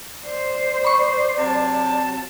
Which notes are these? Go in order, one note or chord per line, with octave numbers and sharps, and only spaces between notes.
C5 D5
B5 C#6
C3 F#3 A5